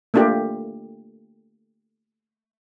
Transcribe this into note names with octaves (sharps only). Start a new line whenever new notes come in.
A3 A#3 D4 F4 G4